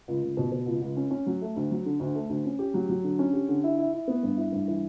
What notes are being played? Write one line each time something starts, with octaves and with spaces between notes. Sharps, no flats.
C#2
C#2
B2
B2
C#2
C#2
C#4
C#4
F#3
A3
D2
F#3
D3
D2
A3
D2
C#4
G4
F#3
F#3
D3
C#4
G4
D3
E4
E4
E4
B3
G2
E4
G2
E3